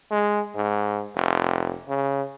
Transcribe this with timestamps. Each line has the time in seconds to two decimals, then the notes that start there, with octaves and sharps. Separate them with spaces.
0.11 G#3
0.56 G#2
1.16 F1
1.88 C#3